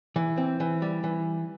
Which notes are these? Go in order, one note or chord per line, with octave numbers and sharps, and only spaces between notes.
E3
C4
E3
G3
E3